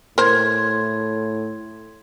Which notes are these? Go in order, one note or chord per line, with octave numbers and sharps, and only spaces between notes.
A2 A#4 C5 C6 G#6